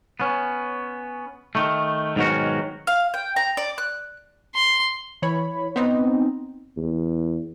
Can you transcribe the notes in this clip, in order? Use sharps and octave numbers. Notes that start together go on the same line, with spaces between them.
B3 C#4
D#3 A3
G#2 B2 D#3 F#3 C#4 F#4
F5
G5
A#5
D5
F#6
C6
E3 C#5 B5
B3 C4 D#4
E2